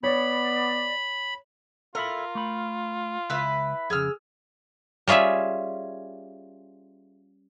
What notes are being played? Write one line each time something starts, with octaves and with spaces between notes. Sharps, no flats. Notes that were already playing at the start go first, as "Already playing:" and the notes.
B3 C#5 D5 B5
F4 A4 A#4 E5 B5
A3 B5
C#2 E4 B4
F2 C#3 G#4 E6 F6
G3 C#4 F4 G#4 E5